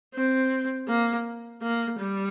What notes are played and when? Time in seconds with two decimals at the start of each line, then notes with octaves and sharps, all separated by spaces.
0.15 C4
0.88 A#3
1.62 A#3
1.99 G3